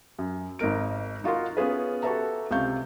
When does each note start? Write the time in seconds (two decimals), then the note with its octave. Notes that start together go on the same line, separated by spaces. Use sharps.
0.19 F#2
0.59 G#1 D#4 A#4 D7
1.24 D#4 F4 F#4 A#4 C6
1.57 B3 C#4 F4 G#4 B4
2.03 F#4 G4 A4 B4 E5 A#5
2.51 C#2 C3 F5 C#6 G6